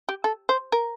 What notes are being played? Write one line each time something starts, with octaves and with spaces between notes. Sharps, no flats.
G4
A4
C5
A#4